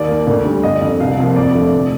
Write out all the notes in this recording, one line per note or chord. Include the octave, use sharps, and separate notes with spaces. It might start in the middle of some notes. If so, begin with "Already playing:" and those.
Already playing: D#2 D5
D#3 A#3
D2
D3 G3
G1 D#5
F2 D3
C2 F5
C3 F3 A#3
F2 D5
D3 F3 A3
F1